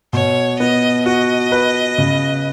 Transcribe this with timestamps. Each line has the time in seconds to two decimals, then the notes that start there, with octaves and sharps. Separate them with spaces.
0.13 B2 C#5
0.60 B3 D#5
1.06 F#4 D#5
1.52 B4
1.98 C#3